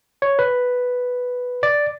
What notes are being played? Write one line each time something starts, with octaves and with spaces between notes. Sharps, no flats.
C#5
B4
D5